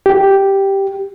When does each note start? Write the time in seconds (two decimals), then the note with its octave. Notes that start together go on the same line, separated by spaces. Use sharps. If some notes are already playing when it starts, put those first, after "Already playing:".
0.06 G4